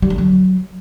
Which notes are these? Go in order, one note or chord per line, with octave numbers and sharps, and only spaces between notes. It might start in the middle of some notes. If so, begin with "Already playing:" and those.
G3
D3
F#3